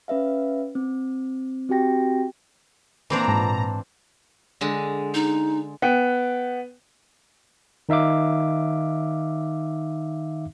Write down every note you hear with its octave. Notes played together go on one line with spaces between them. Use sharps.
C#4 B4 E5 F5
C4
C4 F#4 G4 G5 A#6
A#2 E3 C4 D4 A#5
G#2 A5
D3 G#3
D#4
B3 G5
D#3 D#4 E5 F5 D6